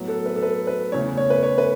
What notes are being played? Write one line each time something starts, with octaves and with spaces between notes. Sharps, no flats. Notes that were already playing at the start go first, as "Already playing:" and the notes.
Already playing: A2 F#3 B3
A4
B4
A4
B4
B4
E2 C#3 A3 C#5
C#5
B4
C#5
B4